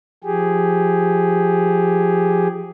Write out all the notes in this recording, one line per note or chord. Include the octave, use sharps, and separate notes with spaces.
F3 G4 G#4